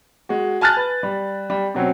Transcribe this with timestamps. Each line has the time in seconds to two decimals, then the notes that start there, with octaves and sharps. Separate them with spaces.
0.29 G#3 F#4
0.61 G#5 A5 F6 F#6 A6
0.77 B4
1.03 G3
1.50 G3
1.74 B2 F#3 C4 C#4